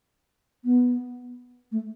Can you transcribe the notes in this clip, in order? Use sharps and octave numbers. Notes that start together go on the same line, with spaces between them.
B3
A3